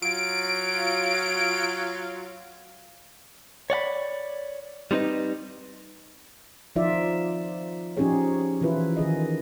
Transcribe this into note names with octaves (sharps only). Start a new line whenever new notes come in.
F#3 F4 D7
C#5 D5 F#5 B5
G3 C4 D#4 B4 D#5
F3 D#4 F4 D5 E5
F3 C#4 D#4 G4 G#4 C#5
E3 E4 F4 B4
D#3 G#4 D#5